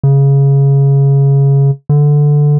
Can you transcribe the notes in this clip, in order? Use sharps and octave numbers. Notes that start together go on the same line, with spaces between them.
C#3
D3